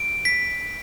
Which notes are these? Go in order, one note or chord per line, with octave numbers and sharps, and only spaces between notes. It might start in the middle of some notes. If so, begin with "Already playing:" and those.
Already playing: D7
B6